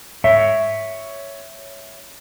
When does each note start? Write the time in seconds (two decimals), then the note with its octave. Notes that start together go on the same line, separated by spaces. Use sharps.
0.24 C#5 E5